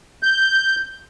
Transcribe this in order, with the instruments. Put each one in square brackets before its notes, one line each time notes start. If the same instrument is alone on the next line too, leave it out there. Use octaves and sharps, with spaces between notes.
[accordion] G6